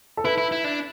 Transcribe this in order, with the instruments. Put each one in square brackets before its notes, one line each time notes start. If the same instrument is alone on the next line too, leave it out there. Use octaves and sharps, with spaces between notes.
[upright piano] A4
[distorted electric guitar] E4 [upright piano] B4
[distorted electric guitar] E4
E4
D4